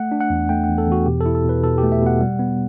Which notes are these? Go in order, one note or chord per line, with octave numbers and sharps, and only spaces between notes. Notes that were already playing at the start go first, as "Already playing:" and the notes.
Already playing: A3 F#5
D4
F#5
E2
A3 G5
E2 F#5
A4
E2 F#4
B2 G4
A4
E4
A4
B2 B4
B2 A4
G4
A3
E5
B2 F#5
G3
B3